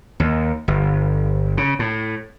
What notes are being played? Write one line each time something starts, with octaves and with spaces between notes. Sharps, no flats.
D#2
G1
C#3
A2